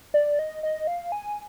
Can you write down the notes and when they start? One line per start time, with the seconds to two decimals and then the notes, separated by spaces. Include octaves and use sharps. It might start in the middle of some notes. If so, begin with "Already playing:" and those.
0.14 D5
0.39 D#5
0.63 D#5
0.87 F5
1.12 G#5